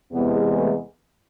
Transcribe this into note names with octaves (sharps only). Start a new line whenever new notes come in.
E2 C3 E3 G#3 B3
A3